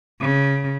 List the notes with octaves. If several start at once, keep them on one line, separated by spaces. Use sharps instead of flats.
C#3